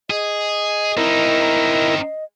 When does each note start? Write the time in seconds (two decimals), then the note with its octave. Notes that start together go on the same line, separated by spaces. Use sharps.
0.10 G#4 D#5
0.97 C4 D#4 E4 A#4